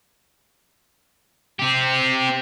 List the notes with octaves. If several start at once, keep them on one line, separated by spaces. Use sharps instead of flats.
C4 G4